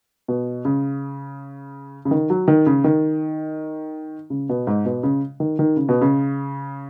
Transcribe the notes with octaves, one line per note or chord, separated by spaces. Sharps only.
B2
C#3
C#3
D#3
F#3
D#3
C#3
D#3
C#3
B2
G#2
B2
C#3
D#3
D#3
C#3
B2
C#3